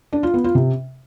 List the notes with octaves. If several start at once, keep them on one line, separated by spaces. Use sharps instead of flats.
D4
F4
B3
F4
C3